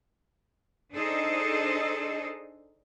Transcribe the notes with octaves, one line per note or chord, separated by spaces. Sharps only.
D4 D#4 G#4 A4 C5 D#5